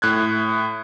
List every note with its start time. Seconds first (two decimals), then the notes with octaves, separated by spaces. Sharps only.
0.02 A2 F#6 G#6